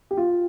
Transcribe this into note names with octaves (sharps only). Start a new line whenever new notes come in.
G4
F4